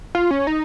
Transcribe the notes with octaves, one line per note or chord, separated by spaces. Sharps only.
F4
C#4
D#4